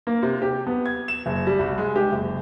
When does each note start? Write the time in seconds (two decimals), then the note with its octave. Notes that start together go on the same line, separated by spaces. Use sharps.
0.07 A#3
0.23 C3
0.42 G4
0.67 B3
0.86 G#6
1.08 E7
1.26 F#1
1.47 G3
1.59 C2
1.78 G#3
1.96 G4
2.12 F#1